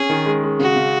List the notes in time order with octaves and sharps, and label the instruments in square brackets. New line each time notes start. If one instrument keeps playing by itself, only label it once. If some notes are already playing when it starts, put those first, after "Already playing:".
Already playing: [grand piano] C#4 [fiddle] G#4
[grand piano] D#3
G#3
G#3
[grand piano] C#3 [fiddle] F#4
[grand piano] C#3